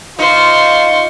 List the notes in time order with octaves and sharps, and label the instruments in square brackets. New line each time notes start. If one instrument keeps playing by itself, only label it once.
[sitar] D#4 [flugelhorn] F4 [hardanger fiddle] C5 C#6